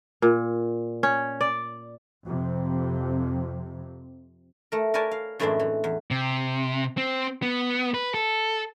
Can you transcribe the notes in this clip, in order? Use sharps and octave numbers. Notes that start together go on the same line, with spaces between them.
A#2
C#4
D5
F2 C3
A3 A#4
A#4 B4 C#5 D5 G#5 A5
F5
F#2 A2 E3 G#3 C4 D4
E3
E2
C3
C4
B3
B4
A4